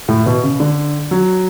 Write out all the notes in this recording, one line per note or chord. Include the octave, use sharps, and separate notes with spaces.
A2
B2
C#3
D3
F#3